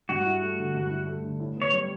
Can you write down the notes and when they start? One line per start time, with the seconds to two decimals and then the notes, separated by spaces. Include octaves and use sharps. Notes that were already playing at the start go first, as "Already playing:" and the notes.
0.09 G2 F#4
0.26 E4
0.42 A3
0.58 D3
0.75 G2
0.91 E4
1.07 A3
1.23 D3
1.40 A2
1.57 B3 C#5
1.73 G3